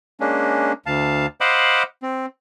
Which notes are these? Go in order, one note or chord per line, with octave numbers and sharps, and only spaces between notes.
G#3 A#3 C#4 D4
D2 F5 A5
C5 D#5 F5 F#5 B5 D6
C4